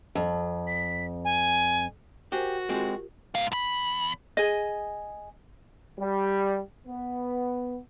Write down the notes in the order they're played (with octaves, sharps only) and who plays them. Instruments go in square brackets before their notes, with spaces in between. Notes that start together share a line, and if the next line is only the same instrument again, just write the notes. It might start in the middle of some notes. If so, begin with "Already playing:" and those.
[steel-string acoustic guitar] F2
[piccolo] B6
G#5
[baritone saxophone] F#4 [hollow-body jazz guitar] G4 [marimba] A#4 C5 G#5
[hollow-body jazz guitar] G#3 C4 [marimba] F4 G4 A#4
[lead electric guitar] G#2 F5
E2 B5
[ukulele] G#4 D#5
[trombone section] G3
B3